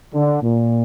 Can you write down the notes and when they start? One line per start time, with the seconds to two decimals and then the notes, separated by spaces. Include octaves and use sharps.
0.14 D3
0.43 A#2